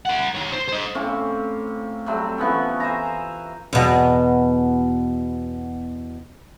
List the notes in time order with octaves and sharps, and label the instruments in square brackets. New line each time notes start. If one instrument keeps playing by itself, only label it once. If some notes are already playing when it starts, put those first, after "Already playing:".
[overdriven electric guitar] A#4 F#5
D#3 C#5
C5
C5 D#5
[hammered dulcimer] A2 A#3 C4 C#4
F#3 G3 A3 C4
E3 F3 B3 C#4
C5 E5 G#5 A#5
[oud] E2 B2